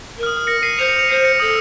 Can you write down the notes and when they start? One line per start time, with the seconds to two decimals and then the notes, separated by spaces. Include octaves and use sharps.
0.17 A#4
0.23 F6
0.26 D#6
0.37 F6
0.47 A#6 C#7
0.63 C7 D#7
0.78 C5 C#7 F7
0.88 C#7 F7
0.98 C#7 F7
1.09 C5 C7 D#7
1.24 A#6 C#7
1.40 A4 D#6